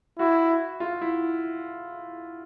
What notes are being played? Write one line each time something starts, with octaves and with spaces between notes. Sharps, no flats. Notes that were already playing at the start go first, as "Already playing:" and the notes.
E4 F#4
F4
E4